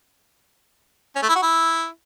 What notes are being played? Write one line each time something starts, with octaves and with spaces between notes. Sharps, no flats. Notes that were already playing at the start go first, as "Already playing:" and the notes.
C#4
A3
E4
F#4
E4